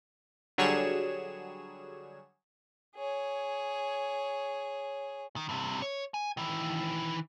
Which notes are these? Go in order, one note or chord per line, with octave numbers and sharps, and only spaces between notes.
D3 F#3 G3 G#4 C#5 E7
G#4 C#5
D#3
G2 C3
C#5
G#5
D#3 E3